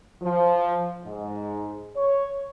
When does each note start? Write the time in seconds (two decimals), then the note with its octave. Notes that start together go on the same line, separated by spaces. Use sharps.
0.22 F3
1.04 G#2
1.96 C#5